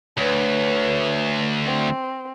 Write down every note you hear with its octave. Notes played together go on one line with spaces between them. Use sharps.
D2 B4 C#5
C4